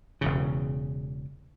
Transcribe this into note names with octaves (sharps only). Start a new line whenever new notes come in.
E1 E2 C#3